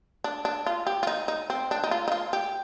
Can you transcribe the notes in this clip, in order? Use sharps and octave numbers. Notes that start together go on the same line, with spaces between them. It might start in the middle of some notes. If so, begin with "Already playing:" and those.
D4
D4
F4
G4
F4
D#4
D#4
C4
D4
D#4
F4
D#4
F4
G4